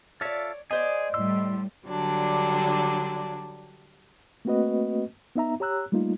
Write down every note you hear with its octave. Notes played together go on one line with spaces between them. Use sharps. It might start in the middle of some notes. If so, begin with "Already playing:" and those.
F4 A4 C#5 D5 E5
B3 G#4 C5 D5 D#5 G#5
A2 G3 C6 E6
D3 F#3 G3 D4
A3 A#3 C4 F#4 B4 D#5
B3 D#4 E5 A#5
G4 C#5 A#5 E6 F#6
G3 A3 A#3 D#4 F4